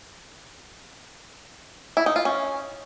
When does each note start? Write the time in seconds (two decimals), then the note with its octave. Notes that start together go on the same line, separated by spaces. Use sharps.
1.97 E4
2.06 D#4
2.16 F4
2.25 C#4